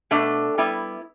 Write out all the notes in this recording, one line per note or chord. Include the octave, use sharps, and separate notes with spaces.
B2 A3 D4
G3 B3 E4